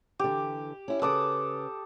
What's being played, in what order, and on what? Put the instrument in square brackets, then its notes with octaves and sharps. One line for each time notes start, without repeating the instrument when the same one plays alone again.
[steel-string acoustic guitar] D3 E3 [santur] G4
[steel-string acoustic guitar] C#4 E4
[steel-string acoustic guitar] C#3 B4 [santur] A4 D6 D#6